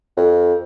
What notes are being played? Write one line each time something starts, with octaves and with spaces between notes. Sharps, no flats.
F2